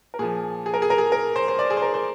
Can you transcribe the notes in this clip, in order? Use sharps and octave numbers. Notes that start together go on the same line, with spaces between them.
A#4
A#2 F3 G#4
G#4
A#4
G#4
A#4
G#4
A#4
C5
C5
D5
G#4
C5
A#4
C5